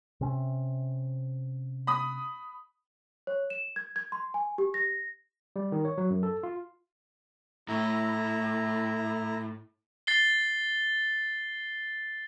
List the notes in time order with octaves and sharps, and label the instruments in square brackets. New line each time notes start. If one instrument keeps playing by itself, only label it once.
[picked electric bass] C3 C#4
[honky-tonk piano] B5 D#6
[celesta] C#5
E7
G#6
G#6
C6
G#5
G4
A#6
[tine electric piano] G3
D#3
C#5
F#3
F#2
A4
F4
[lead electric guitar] A2 [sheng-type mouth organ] E4 A#5
[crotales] A6 C7 G7